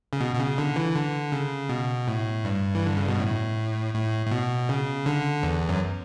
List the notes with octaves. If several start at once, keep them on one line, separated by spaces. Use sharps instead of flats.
C#3
B2
B2
C#3
D3
E3
D3
C#3
B2
A2
G2
E3
D3
C#3
B2
A2
A2
A2
B2
C#3
D3
E2
F#2